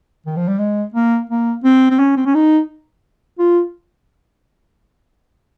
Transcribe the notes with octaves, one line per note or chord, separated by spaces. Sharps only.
D#3
F3
G3
G#3
A#3
A#3
C4
C4
C#4
C4
C#4
D#4
F4